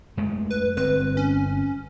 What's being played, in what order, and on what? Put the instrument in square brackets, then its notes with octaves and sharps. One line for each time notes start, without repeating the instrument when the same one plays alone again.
[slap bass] F#2 G#3 A3
[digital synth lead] B4
[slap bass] G1 C4 [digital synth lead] B4
[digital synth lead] C#4